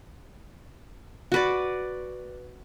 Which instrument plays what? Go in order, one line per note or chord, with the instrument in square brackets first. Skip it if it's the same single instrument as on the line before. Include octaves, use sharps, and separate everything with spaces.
[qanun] F#4 B4 D5